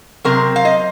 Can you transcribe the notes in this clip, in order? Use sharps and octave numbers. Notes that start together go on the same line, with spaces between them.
C3 F#3 C4 A#4
F5
D#5